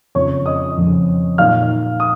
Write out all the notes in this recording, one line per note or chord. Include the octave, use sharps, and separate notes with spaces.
F2 C#3 F3 C#5 C#6
D#5 D#6
F2 C#3 F3
A#2 F#3 A#3 D#4 F5 F6
D#6